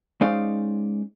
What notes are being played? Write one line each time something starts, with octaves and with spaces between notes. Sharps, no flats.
G#3 C#4 D#4 C5 D5 F5